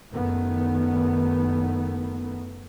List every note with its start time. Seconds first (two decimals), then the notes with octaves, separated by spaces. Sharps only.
0.13 F#1 D#3 A3 B3